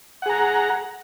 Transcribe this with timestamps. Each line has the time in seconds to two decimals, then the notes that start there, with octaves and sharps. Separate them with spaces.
0.22 F#5
0.26 G#4
0.29 A#5